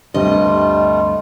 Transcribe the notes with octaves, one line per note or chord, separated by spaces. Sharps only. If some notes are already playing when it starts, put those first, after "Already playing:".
D2 G2 C3 G3 A3 F4 D#5